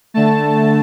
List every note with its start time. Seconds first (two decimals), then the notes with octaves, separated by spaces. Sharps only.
0.14 D3 A3 A5